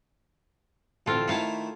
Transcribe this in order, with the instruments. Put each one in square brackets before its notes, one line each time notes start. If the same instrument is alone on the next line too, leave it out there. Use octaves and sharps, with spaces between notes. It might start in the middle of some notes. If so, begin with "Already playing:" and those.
[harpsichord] A1 D2 [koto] C4 F4 A4
[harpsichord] D#3 A3 E4 [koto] C#5 F5 A5